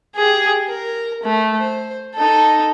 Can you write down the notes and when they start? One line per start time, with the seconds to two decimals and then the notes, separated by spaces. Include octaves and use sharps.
0.15 G4 G#4
0.68 A#4
1.23 A3
1.58 C5
2.14 D#4 A4